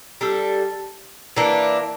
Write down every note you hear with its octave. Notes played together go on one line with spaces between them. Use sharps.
G3 D4 A4
E3 A#3 D4